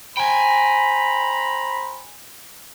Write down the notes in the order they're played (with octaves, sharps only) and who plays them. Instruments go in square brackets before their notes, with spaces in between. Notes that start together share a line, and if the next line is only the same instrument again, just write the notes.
[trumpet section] C5 A#5 B5 [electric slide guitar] G5 G#5